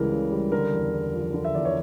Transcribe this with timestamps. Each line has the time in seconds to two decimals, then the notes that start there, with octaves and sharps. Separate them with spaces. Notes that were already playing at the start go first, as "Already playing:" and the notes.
Already playing: C#2 C#3 E3 G3 A#4
0.11 C#3
0.32 G3
0.52 D3 A#4
0.73 E2
0.93 E2
1.13 F3
1.34 D3
1.44 E5
1.55 E2 D5
1.65 C#5